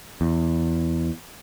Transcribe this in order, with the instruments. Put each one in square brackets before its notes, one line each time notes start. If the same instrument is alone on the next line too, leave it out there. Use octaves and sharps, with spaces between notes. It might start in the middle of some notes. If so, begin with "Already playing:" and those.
[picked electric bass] E2